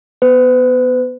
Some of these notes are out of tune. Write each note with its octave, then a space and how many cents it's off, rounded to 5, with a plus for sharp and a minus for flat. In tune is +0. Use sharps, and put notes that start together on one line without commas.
B3 +0 B4 +40